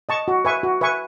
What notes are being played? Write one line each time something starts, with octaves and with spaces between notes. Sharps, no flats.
D#5 A5 C#6
F#4
B4 E5 G#5 C#6
F#4
B4 E5 G#5 C#6